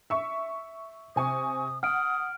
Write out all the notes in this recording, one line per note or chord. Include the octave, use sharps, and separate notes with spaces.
E5 C#6
C3 G#5 C#6 D#6
F#5 D#6 F6 D7